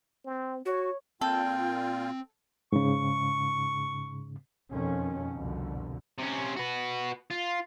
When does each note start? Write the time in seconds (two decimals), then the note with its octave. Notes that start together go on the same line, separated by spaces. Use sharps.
0.25 C4
0.66 F#4 C#5
1.21 A#2 C4 F4 A4 G5
2.72 G#2 C#3 C#6
4.71 F2 B2 D#3 C#4
5.35 C2 F2 B2 D3
6.19 C3 C#4
6.56 F#4 B4
7.30 F4